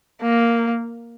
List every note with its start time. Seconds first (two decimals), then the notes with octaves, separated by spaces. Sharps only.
0.22 A#3